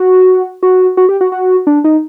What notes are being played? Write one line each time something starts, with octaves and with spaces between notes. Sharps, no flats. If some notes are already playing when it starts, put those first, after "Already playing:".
Already playing: F#4
F#4
F#4
G4
F#4
F#4
D4
D#4